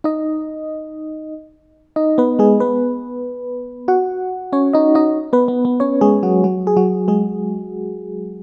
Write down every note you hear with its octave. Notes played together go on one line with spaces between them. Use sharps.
D#4 D#5
D#4 D#5
B3 B4
G#3 G#4
B3 B4
F#4 F#5
C#4 C#5
D#4 D#5
D#4 D#5
B3 B4
B3
B3
C#4 C#5
G#3 G#4
F#3 F#4
F#3 F#4
G#4
F#3 F#4
G#3 G#4